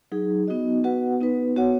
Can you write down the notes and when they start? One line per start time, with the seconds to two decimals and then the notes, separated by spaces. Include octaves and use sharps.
0.12 F#3 D#4 G#4
0.48 B3 D#4 F#4 D#5
0.84 B3 F#4 B4 F#5
1.21 B3 D#4 B4
1.56 B3 F#4 C#5 F#5